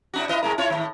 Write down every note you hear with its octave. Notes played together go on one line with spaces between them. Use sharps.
A2 D4 F#4
E4 B4 D#5
G#2 G#4 A#4
E4 F4 C#5
A2 D#3